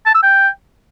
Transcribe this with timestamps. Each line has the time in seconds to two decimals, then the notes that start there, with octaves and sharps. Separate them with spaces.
0.06 A5
0.15 E6
0.23 G5